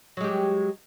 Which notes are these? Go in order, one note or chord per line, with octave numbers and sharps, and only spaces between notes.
F#3 G#3 G4